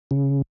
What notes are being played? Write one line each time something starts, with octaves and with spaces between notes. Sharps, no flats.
C#3